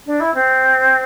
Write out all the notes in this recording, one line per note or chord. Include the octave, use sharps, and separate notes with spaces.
D4
E4
C4